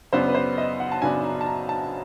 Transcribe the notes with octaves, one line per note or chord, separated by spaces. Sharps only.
F#2 C#3 F#3 B3 D4 C5
B4
C5
D#5
F#5
A5
F#2 C#3 F#3 B3 D4 G#5
A#5
A5
A#5
A5